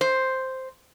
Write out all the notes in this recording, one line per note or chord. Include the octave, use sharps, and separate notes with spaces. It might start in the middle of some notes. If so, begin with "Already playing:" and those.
C5